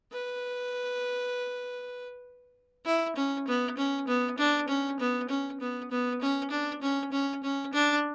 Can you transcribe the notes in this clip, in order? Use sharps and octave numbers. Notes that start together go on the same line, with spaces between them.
B4
E4
C#4
B3
C#4
B3
D4
C#4
B3
C#4
B3
B3
C#4
D4
C#4
C#4
C#4
D4